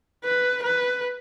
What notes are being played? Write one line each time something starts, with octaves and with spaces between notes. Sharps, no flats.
B4
B4